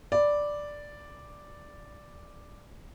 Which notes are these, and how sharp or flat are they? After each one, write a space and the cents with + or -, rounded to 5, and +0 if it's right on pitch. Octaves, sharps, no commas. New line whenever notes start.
D5 +0 B5 +0